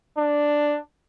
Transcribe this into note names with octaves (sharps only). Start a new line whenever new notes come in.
D4